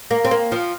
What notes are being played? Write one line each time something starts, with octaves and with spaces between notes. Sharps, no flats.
A#3
C4
A#3
F3